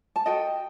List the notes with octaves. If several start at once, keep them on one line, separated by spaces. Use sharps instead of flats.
A5
F#4 A4 D#5 G5